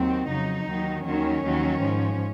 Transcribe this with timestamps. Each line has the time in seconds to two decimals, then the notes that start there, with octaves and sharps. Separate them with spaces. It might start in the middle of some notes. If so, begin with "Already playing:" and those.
Already playing: D#2 D#3 F#3 C4
0.28 F2 C#3 F#3 D#4
0.67 D#2 D#3 F#3
1.05 D#2 D#3 F#3 C#4
1.44 D#2 D#3 F#3
1.81 G#2 F3